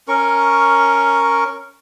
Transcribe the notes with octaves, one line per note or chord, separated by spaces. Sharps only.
C#4 A#4 C#6